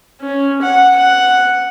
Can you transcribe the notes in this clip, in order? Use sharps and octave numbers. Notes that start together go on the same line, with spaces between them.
C#4
F#5
F#5